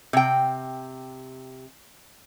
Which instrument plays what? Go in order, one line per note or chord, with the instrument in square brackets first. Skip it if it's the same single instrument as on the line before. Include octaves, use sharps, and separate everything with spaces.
[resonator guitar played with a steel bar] C3 G5